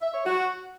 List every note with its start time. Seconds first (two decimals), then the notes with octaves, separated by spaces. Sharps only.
0.02 E5
0.14 C#5
0.25 F#4